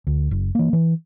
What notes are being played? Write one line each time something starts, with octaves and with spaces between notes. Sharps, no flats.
D2
F#1
E3 A#3
E3